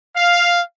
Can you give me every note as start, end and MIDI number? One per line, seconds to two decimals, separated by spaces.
0.17 0.61 77